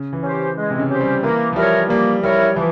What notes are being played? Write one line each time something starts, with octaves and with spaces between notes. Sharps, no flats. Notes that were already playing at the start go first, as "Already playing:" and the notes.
Already playing: C#3
E3
C#4 G4 C5
G#3
C3
C#3
C#4 G4 C5
G3
E3 A#3
F3
G3 E4 A#4 C#5
G3 A#3
G3 E4 A#4 C#5
E3 F3